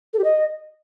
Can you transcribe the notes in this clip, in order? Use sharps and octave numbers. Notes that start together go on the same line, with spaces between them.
A4
G4
D#5